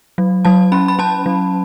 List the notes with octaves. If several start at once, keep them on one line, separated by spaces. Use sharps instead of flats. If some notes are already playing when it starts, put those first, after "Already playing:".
F#3
F#3 A5
C#4 B5
B5
C#4 A5
F#3